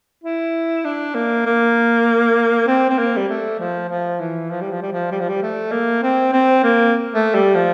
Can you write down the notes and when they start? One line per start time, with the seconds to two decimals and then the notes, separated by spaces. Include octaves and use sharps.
0.24 E4
0.85 D4
1.15 A#3
1.46 A#3
2.67 C4
2.90 C4
2.99 A#3
3.16 G3
3.29 A3
3.60 F3
3.89 F3
4.20 E3
4.50 F3
4.61 G3
4.71 F3
4.82 G3
4.93 F3
5.11 G3
5.20 F3
5.29 G3
5.42 A3
5.72 A#3
6.03 C4
6.33 C4
6.63 A#3
7.14 A3
7.34 G3
7.55 F3